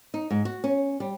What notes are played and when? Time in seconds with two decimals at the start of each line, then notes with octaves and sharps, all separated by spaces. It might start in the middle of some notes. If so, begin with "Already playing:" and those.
0.14 D#4
0.30 G#2
0.45 F#4
0.64 C#4
1.00 G3